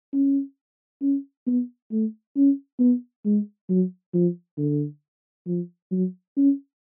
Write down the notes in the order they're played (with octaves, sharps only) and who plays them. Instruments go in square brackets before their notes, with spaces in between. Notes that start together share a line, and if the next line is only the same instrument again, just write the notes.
[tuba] C#4
C#4
B3
A3
C#4
B3
G#3
F#3
F3
D3
F3
F#3
C#4